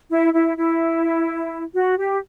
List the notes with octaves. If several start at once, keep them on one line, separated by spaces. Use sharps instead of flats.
E4
E4
E4
F#4
G4